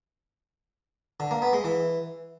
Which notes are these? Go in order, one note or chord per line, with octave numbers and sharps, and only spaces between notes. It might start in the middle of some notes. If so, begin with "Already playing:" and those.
D3
A#3
B3
G#3
E3